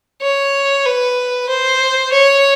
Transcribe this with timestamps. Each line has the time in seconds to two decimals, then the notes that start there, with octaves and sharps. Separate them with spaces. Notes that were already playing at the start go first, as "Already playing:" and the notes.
0.22 C#5
0.86 B4
1.49 C5
2.12 C#5